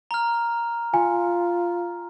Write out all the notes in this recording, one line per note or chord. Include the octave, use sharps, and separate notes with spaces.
A#5 F6
F4 G#5